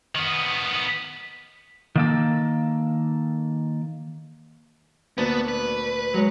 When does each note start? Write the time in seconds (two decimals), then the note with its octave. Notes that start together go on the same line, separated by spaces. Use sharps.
0.15 D#3 B3
1.96 D#3 A#3 A4
5.18 D2 A#2 B3 A5
5.48 B4
6.14 F#3 G#3 C#5